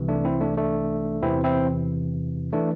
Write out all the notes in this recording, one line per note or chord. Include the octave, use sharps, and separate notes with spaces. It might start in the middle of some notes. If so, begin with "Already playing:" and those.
Already playing: C2 C3 E3
A3 D4
C4 E4
A3 D4
A3 D4
E2 C3 E3 C4 E4
C4 E4
E3 A3 D4